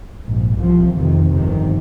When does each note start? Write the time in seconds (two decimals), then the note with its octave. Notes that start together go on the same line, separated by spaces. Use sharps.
0.24 A#1 G#2
0.59 C2 C3 F3
0.94 F1 F2 C3 D#3
1.30 G1 F2 C3 D#3